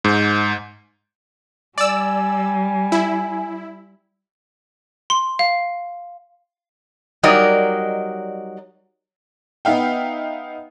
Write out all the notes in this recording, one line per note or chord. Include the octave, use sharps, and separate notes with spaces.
G#2
G3 D5 G#5 E6
E4
C6
F5
F#3 G3 D#4 A#4 D5 D#5
B3 D#4 E5 F5 G5